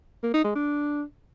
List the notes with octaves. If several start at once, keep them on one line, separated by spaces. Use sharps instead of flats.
A#3
D#4
G#3
D4